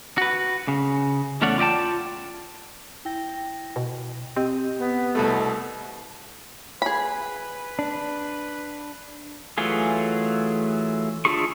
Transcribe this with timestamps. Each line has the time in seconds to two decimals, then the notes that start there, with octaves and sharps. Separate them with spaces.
0.18 F#4 B4
0.68 C#3
1.42 E2 A3 C#4 C#5 D5 F#5
1.58 F4 D5 D#5 G5 A5
3.05 E4 G5 A#6
3.76 B2
4.36 C4 G4 D#5
4.78 B3
5.15 C2 B2 A3
6.82 G#4 B4 B5
7.79 D4
9.58 E3 F#3 A3 F4 G#4
11.25 D4 E4 F4 G#4 C#6